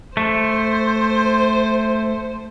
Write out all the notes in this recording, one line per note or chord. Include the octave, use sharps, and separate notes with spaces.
A3 C5